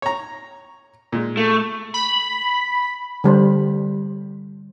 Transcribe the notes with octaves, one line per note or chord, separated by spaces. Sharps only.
C#5 A#5
A#2 G#3
A3
B5
D3 G3 C5